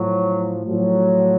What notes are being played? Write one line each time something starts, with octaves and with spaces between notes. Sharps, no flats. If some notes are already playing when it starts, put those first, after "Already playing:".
Already playing: A2 F3 F#3
A2 F3 F#3